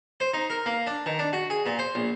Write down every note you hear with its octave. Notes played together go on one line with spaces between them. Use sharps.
C5
D#4
A#4
A#3
D4
D#3
D4
F#4
G#4
A#2
C5
A#1